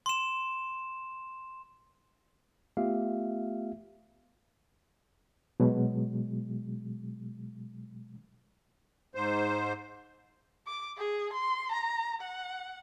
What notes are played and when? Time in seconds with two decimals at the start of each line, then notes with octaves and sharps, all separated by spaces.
0.06 C6 E7
2.77 A3 B3 F4 G4 E5 F5
5.60 B2 F#3 G#3
9.15 G#2 C5
10.67 D6
10.97 G#4
11.33 C6
11.72 A#5
12.21 F#5